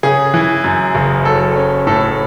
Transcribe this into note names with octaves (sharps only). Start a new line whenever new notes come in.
C#3 G#4
E3
F#2
F#1
F#3 A4
C#4
A2 A4